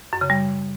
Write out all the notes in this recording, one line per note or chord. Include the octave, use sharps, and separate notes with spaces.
F#2
C#3
G3